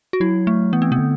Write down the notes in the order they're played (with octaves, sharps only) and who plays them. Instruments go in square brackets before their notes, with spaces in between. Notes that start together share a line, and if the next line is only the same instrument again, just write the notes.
[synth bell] F#4
[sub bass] F#3 [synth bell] E4
[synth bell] A3
[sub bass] E3 [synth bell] B3
[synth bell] C4
[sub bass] C3 [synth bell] B3
[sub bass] D3